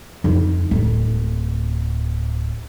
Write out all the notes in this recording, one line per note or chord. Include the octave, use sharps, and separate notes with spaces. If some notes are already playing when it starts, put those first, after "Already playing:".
F2 D#4
D1